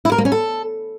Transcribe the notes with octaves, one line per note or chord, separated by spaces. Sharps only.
E4
A#4
A#3
C#4
A4